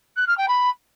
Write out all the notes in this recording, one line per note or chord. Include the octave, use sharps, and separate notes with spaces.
F#6
F6
G5
B5